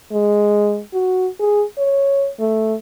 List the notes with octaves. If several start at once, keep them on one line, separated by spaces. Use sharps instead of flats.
G#3
F#4
G#4
C#5
A3